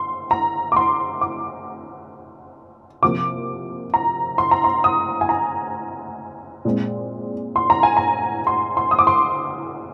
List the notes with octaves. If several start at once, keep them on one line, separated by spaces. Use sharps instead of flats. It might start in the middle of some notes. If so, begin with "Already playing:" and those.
Already playing: C6
A#5
D6
C6
D6
C3 F3 A#3 D6
A#5
C6
A#5
C6
D#6
G#5
A#5
A#2 G#3 C4
C6
A#5
G#5
A#5
C6
C6
D#6
D6
C6